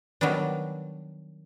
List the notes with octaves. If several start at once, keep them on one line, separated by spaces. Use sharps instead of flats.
D#3 F#3 G3 B3 D4